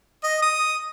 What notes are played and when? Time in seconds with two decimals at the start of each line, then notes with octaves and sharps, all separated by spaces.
0.24 D#5
0.42 D#6